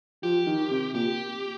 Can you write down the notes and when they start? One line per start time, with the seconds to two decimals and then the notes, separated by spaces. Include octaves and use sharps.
0.23 F3 G4
0.47 D#3
0.71 C3
0.95 A#2 G4